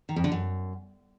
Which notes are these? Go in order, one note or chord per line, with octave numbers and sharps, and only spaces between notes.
D#3
F2
D3
F#2